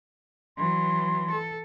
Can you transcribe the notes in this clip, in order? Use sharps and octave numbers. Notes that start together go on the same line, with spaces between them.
E3 F#3 C6
A4